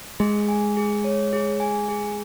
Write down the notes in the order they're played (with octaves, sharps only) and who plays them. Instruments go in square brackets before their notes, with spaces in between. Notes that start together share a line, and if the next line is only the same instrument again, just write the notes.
[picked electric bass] G#3 [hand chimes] G#4
[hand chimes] G#5
G#4
C#5
G#4
G#5
G#4